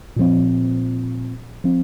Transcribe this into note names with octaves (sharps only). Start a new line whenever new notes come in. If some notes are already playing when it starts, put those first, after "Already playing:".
A#2 F3 C4
F3 C4